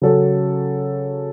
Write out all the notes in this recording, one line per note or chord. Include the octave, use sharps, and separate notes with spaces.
C#3 F#3 C#4 A4